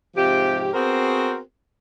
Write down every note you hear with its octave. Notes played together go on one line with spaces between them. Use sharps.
G#2 C3 F3 G4
B3 C4 F#4 G#4 A#4 C5